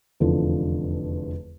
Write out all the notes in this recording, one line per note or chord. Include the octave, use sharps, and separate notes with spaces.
F1 E2 D3 F3 F4 A4